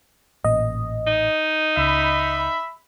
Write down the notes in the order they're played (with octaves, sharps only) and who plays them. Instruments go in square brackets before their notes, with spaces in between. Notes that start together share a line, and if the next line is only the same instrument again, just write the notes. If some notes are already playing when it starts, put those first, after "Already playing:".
[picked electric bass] A1 A#2 [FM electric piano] D#5
[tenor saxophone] D#4
[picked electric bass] C#2 [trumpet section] E5 B5